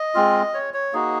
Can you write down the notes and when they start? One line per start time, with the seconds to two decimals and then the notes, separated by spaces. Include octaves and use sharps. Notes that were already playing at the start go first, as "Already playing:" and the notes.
Already playing: D#5
0.15 G#3 C4 F4
0.54 C#5
0.74 C#5
0.93 A#3 D#4 F#4 G#4